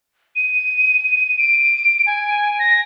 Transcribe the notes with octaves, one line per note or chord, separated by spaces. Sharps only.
D#7
D7
G#5
A#6